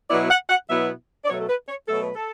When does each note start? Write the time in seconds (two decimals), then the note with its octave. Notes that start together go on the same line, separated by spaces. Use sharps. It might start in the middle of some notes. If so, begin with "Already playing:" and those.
0.10 B2 F#3 B3 E4 D5
0.30 F#5
0.50 F#5
0.69 B2 F#3 B3 E4 E5
1.25 D5
1.29 B2 F#3 A3 C#5
1.40 A4
1.48 B4
1.69 C#5
1.88 B2 F#3 A3 A4
2.02 B4
2.16 A4